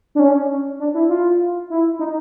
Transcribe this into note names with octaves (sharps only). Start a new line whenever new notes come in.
D4
C#4
D4
E4
F4
E4
D#4